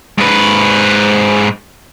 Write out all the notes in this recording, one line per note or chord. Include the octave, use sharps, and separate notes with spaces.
G#2 B4